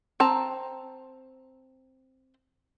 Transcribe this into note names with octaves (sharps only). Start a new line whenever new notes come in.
C4 A5 A#5